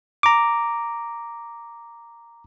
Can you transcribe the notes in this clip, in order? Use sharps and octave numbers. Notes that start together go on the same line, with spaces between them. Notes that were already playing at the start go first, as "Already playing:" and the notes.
A#5 D6